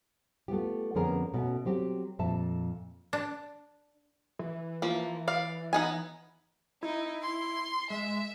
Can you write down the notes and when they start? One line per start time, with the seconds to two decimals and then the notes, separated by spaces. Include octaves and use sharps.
0.48 A3 B3 F4 G4
0.95 F2 D3 B3 C#4 G#4 A#4
1.34 B2 A3 C#4
1.65 F#3 C4 G4
2.19 F2 A#2 E5 A5
3.13 D4
4.39 E3
4.82 F3 A#3
5.28 D5 F5
5.73 B3 D#4 G#5
6.83 D#4 E4
7.22 C6
7.90 G#3 E5